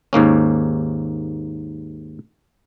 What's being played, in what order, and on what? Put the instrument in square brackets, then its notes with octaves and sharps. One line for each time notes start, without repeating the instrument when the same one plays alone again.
[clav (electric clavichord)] D#2 G#2 A#3 C#4